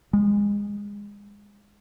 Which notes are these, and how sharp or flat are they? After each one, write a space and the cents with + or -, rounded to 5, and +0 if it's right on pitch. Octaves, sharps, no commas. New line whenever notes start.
G#3 -25